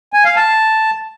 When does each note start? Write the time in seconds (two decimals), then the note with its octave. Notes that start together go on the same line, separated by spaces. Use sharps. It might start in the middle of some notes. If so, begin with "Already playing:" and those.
0.13 G#5
0.25 F5
0.36 A5